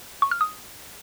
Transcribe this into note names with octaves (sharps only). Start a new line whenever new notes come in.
C#6
F6
D#6